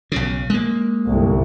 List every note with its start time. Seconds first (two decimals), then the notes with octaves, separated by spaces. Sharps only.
0.12 B1 C#3
0.50 G#3 A#3
1.08 G1 C2